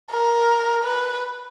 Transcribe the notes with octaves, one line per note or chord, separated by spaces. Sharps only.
A#4
B4